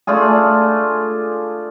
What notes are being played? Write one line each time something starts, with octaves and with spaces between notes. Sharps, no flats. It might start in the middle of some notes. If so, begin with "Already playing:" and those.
A3 D4 F4 G#4